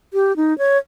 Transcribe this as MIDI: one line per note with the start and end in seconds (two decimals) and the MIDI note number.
0.14 0.36 67
0.36 0.56 63
0.58 0.78 73